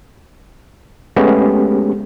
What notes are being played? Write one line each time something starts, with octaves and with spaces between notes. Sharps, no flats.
G#3 A3 B3 C#4 G4 G#4